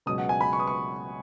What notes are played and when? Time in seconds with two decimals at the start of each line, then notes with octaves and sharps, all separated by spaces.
0.06 C#2 B2 F#3 D#6
0.18 F#5
0.29 G#5
0.41 B5
0.53 C#6
0.60 D#6
0.67 C#6